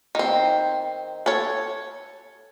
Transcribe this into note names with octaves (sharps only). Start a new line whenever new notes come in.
D#3 C4
A4 C#5